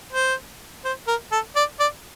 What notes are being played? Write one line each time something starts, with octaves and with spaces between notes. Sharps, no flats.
C5
C5
A#4
A4
D5
D5